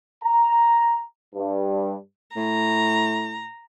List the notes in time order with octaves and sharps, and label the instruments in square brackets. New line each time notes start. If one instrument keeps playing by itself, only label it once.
[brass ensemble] A#5
G2
[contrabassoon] A2 [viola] A#5